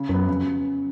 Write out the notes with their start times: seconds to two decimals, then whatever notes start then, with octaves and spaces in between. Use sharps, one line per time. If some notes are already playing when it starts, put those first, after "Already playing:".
Already playing: C#3
0.09 F#2 F#3 B3
0.27 F2 C#3